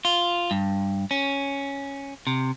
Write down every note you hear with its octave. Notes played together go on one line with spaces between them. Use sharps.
F4
G2
C#4
C3